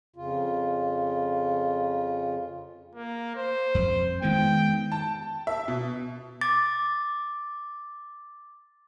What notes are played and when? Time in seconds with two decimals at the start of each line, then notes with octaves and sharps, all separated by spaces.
0.16 F2 C#3 F4
2.95 A#3
3.36 C5
3.75 F2
4.22 D#3 G#3 B3 G5
4.92 A5
5.47 E5
5.68 B2
6.41 D6 A6